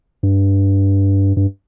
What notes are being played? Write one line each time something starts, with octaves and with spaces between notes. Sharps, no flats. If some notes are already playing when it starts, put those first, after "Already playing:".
G2
G2